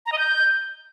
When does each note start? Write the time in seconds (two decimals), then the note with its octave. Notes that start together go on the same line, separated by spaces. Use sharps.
0.06 A#5
0.12 D#5
0.18 G6